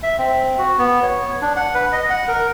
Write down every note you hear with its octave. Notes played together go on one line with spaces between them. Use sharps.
E5
C4
F#4
B3
C#5
D4
F#5
B4
D#5
F#5
A#4